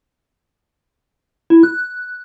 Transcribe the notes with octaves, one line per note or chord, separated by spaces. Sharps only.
E4
F#6